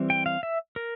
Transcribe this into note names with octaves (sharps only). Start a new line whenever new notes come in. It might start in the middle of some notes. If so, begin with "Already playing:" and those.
Already playing: E3 G3 C4
G5
F5
E5
A#4